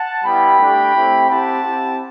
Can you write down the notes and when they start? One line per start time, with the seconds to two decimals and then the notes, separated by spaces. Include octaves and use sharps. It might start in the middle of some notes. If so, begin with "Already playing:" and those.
Already playing: F#5 A5
0.24 G3 B3 E4 G4 G5 B5
0.59 A3 D4 G4
0.95 A3 C4 E4 G4
1.30 C4 E4 G4 F#5 A5
1.65 C4 E4 G4